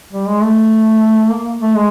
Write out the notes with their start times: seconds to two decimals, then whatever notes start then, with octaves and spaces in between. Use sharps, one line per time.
0.13 G3
0.28 G#3
0.42 A3
1.31 A#3
1.61 A3
1.75 G#3